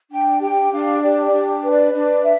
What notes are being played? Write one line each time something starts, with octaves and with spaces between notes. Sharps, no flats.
D4 G5
G4 G5
D4 F5
G4 D5
D5
D4
B4
D5
D4 D5
E5